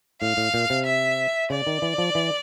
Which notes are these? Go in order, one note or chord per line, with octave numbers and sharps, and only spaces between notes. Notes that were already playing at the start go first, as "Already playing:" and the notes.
A2 F5
A2
A#2
C3
E5
C#3 D5
D#3
E3
F3
E3